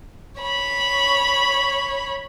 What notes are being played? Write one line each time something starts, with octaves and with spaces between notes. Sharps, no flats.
C#5 B5